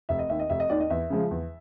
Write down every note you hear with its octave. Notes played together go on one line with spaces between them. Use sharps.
F1 E5
D#5
D#2 D#3 E5
D#5
F1 E5
D#5
D#2 D#3 D5
D#5
E2 E5
C#3 F3 G#3
E2